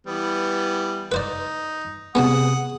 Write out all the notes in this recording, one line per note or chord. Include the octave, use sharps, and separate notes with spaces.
E3 G3 B3
D#4 B4 C5 D5
C3 B3 C#4 F#4 G#4 F#5 D#6